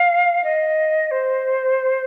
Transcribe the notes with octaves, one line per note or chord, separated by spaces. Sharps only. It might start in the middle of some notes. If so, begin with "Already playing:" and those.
Already playing: F5
D#5
C5